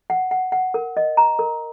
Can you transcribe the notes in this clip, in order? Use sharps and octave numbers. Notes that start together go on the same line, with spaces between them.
F#5
F#5
F#5
A#4
D#5
A#5
A#4